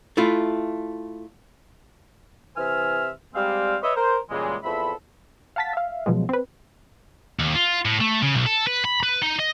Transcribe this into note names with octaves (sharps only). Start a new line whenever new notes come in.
A3 E4 F4
C3 E3 C5 E5 G#5 F6
G3 G#3 C4 F5
B4 C#5 D#5 E5
A#4 C5
A#2 C#3 E3 G3 G#3
E2 F3 C4 A4 E5 B5
F5 F#5 A5 A6 B6
E5 F5
B2 F3 F#3 G#3
C4 B4
D#2
F4
A2
A3
C#3
B1
A4
B4
B5
B4
D#4
D#5